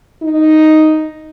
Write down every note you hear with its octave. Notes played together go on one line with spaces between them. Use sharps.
D#4